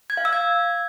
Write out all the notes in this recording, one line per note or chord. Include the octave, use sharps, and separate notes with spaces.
G#6
F5
E6
G#6